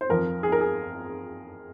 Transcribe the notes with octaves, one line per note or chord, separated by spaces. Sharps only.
C5
F2 F3 A#4
G#4
A#4
G#4